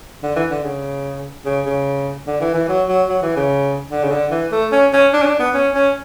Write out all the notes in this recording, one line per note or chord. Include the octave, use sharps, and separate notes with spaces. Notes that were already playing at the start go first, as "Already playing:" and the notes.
D3
E3
D3
C#3
C#3
C#3
D3
E3
E3
F#3
F#3
F#3
E3
C#3
D3
C#3
D3
E3
A3
C#4
C#4
D4
C#4
D4
B3
C#4
C#4